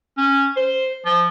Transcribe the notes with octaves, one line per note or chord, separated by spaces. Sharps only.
C#4
C5
F3